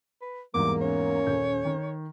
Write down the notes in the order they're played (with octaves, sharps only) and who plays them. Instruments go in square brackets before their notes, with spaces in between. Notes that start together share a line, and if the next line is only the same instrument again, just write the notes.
[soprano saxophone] B4
[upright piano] E2 G#2 E3 [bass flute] G3 [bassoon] A#3 [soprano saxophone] D6
[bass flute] C#4 [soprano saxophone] C#5
[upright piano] D#1 G6
D#3